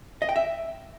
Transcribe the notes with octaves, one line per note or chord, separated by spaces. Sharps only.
D#5
G5
E5